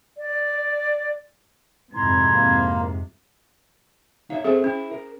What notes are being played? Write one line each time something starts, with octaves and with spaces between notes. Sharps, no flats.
D5
F2 G#2 C3 E4 A#5 C6 G#6
A#3
D#4 C#5 E5 F5
C4 G#4 A4 C5 E5
C#4 E4
A#4